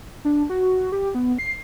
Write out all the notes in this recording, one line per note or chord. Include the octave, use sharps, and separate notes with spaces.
D4
F#4
G4
B3
C7